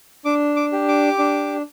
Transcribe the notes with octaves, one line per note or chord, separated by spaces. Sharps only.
D4 D6
D6
G4
D6
D4